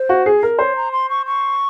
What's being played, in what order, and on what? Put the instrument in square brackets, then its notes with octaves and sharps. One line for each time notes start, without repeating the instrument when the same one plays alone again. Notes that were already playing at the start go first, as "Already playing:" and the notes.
Already playing: [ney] C5
[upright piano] F#4
G#4
A#4
[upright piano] C5 [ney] C#5
[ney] A#5
C6
C#6
C#6